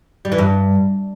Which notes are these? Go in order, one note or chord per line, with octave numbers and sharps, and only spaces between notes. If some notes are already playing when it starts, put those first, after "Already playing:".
G3
E3
G2